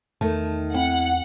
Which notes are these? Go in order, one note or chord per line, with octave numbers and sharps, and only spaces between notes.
E2 D#3 A3 A5
C4 E4 F#5 G5 F#7